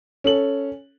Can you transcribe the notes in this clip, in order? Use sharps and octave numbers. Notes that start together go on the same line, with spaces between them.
C#4 A4 F#7